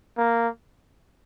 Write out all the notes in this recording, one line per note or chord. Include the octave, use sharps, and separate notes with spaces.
A#3